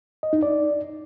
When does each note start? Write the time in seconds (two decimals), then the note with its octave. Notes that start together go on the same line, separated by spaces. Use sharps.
0.23 D#5
0.33 D#4
0.43 D5